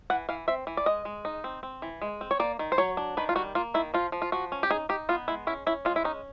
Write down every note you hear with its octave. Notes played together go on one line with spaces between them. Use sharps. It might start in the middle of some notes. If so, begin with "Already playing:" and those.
E3 F#5
E3 F5
C4 E5
E3
D5
G#3 D#5
G#3
D#4
C4
C4
E3
G#3
C4
C#5
A#3 D5
D#3
C5
F#3 C#5
D4
D#3 B4
F4
G3 F#4
A#3 F4
D#3 E4
F3 F4
F3
F4
F3 F#4
C#4
G4
D#4 G#4
D#4 G4
B3 F4
G#3 E4
C#4 E4
C#4 E4
G#3 F4
E4
C#4 D#4